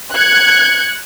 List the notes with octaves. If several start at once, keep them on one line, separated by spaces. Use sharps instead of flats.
F#6 G#6 C#7